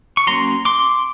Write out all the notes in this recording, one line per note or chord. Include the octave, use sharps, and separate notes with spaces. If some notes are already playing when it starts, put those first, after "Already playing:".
C#6
F#3 A#3 C#4 A#5 C6
C6 D6